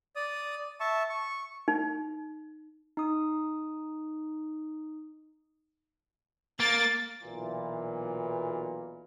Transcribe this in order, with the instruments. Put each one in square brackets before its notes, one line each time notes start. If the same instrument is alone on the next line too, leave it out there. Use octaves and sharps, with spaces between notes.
[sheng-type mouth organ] D5 D#6
E5 A5 C#6
C#6
[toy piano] D#4
[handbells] D#4 D#6
[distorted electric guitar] A#3 [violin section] A6
[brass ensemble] B1 A#2 E3